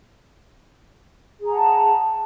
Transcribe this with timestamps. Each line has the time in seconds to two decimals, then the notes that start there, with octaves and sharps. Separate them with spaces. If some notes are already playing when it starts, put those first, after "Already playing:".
1.40 G#4
1.45 A#5
1.50 F#5
1.55 A5